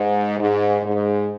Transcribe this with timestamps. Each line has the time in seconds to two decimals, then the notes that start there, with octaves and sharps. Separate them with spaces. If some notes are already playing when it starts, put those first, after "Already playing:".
Already playing: G#2
0.39 G#2
0.83 G#2